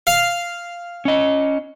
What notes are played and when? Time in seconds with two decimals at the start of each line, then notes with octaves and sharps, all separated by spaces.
0.07 F5
1.05 C#4 D#5